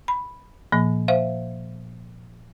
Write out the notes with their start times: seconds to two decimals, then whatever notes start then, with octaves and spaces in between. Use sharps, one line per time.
0.08 B5
0.72 A#2 F3 A#3
1.08 C5 E5 F5